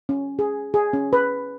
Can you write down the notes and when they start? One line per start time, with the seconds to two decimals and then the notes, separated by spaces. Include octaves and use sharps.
0.09 C#4
0.39 G#4
0.74 G#4
0.93 C#4
1.13 B4